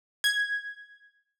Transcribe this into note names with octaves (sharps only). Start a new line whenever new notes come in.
G#6